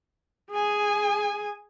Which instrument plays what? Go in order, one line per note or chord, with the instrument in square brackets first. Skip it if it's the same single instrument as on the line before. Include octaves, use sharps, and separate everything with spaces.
[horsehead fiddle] G#4 G#5